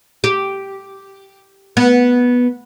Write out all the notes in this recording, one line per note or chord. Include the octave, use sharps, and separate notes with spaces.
G4
B3